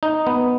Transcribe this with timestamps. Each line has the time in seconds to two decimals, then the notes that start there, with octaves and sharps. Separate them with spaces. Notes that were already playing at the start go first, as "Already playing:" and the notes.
0.03 D#4
0.27 B3